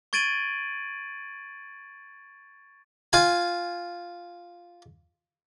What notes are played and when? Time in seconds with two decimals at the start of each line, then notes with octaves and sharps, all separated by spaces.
0.13 C#6 G#6 A6 D7 D#7 F#7
3.13 F4 G#5